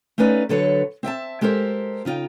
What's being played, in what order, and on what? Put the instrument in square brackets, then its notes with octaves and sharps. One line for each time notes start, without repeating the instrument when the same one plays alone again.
[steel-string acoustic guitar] A3 C#4 D#4 B4 D5 F5
D3 F#3 A4 B4 C#5
C4 E5 G5 A5
G#3 G4 A4 A#4 C5
C#3 D#4 F4 G5